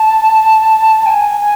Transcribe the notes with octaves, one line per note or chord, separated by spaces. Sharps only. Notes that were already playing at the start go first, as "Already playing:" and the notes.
Already playing: A5
G5
G#5
G#5